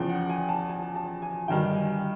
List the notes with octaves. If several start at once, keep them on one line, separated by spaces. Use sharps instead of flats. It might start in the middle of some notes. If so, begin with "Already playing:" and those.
Already playing: E2 C#3 F3 G5
F#5
G#5
A5
G#5
A5
G#5
G1 G2 D#3 F#3 G5
G#5